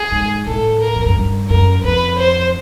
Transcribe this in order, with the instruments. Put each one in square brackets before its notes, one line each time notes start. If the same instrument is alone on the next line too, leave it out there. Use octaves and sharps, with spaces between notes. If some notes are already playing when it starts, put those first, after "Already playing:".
Already playing: [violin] G#4
[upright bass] G#2
[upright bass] A2 [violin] A4
[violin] A#4
[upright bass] F2
F#2
G2
[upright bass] F#2 [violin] A#4
[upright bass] F2 [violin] B4
[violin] C5